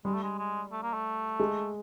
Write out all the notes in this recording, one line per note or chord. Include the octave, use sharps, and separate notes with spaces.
G3 G#3
A3
G#3
G#3
A3
A#3
A3
G#3